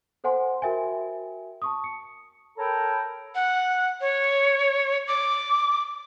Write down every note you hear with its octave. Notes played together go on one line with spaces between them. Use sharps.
A4 C5 F#5 G#5 C6
F#4 A#4 E5 G5 G#5
A5 C#6 D#6
C#7
A4 A#4 C#5 G5 A#5 B5
F#5
C#5
D6